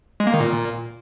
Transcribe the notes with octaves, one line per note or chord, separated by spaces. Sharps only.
G#3
A#3
D#3
A#2